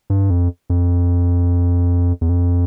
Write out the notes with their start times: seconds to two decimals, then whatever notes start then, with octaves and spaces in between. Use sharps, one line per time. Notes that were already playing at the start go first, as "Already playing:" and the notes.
0.10 G2
0.30 F2
0.70 F2
2.21 E2
2.29 F2